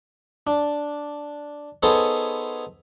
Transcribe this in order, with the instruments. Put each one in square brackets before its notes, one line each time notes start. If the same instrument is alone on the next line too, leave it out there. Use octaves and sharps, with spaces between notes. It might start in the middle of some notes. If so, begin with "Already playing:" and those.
[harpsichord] D4
B3 D#4 G#4 A4 C5 C#5